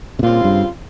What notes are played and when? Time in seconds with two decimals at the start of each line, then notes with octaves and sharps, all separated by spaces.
0.19 C3
0.23 A#2 C#3 G3 C4 F4
0.44 G2